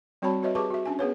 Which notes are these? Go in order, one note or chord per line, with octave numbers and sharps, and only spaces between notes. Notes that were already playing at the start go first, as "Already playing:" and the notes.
G3 C4 F#4 C#5 A5 B5
F#4 B4 C#5 D#5 E5
G4 G#4 B4 A5 C#6 D6
F#4 E5
C#4 D4 G#5
B3 G#4 B4 C#5